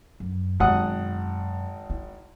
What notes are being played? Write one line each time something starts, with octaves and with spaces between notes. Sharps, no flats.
F#2
G#1 F#2 B2 F#5 D#6
E4